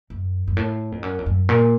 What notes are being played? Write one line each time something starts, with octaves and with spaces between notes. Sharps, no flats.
F#2
F#2
A2
F2
F#2
F2
F#2
A#2